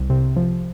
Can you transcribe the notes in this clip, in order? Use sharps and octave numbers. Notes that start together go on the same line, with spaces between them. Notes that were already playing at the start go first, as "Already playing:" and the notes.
Already playing: C2
C3
F3